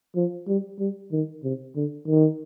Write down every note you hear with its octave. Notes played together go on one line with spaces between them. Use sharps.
F3
G3
G3
D#3
C3
D3
D#3